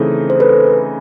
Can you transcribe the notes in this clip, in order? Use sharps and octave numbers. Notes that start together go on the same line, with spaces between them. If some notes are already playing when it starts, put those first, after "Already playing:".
Already playing: C#3 E3 A3 C4 D#4
C5
A4 B4